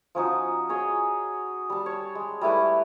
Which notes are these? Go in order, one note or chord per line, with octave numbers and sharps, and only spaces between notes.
F3 C#4 D#4 F#4
F#4 G#4 C#5 D#5
G3 A5
C#5
G#3
G3 A3 E4 B4